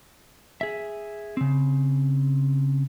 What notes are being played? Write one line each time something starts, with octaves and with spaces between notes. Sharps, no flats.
G#4 E5
C#3 C4